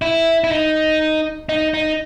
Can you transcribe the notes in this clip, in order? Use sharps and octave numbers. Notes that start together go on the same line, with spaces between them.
E4
E4
D#4
D#4
D#4